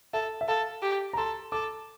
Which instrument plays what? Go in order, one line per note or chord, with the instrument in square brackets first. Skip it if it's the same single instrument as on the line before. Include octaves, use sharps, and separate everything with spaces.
[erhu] A4 [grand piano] E5
[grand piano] E5
[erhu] A4 [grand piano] F5
[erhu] G4
[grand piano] A#5
[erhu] A4 [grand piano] C6
[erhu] A4 [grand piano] D6